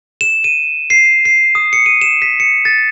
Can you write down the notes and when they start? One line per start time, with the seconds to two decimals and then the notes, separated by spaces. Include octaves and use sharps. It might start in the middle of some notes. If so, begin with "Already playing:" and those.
0.21 E7
0.44 D#7
0.90 C7
1.25 C7
1.55 D#6
1.73 C#7
1.86 D#7
2.01 E7
2.22 B6
2.40 C#7
2.65 A6